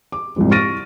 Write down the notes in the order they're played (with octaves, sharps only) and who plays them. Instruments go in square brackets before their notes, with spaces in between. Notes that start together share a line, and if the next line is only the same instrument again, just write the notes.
[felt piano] D6
C2 F2 G#2
C#6 F6 A6 A#6 D7 D#7